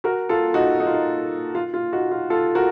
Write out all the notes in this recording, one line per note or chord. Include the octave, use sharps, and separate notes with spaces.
F#4 A#4
F4 A4
D#4 F#4
D#4
F4
D#4
F4
F4
D#4 F#4
F4
F4 A4
F#4 A#4